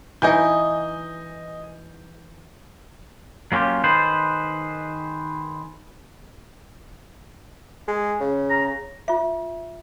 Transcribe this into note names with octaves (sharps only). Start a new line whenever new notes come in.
E3 D#4 D#5 G#5 G6
F#3 A#3 C#4 F4 G4
D#3 G#4 B4 C5
G#3
C#3
A#5
F4 E5